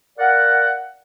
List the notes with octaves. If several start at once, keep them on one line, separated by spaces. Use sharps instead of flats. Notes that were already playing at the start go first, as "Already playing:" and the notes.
A#4 D5 F5 F#5